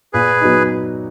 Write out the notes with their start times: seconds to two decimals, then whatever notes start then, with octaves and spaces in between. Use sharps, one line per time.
0.13 A#2 G#4 B4
0.41 F#3 B3 D#4